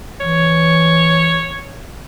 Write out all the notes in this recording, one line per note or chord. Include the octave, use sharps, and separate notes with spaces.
E3 C#5